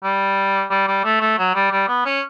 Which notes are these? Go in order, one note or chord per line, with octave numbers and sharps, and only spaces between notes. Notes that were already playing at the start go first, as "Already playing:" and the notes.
G3
G3
G3
A3
A3
F#3
G3
G3
B3
C#4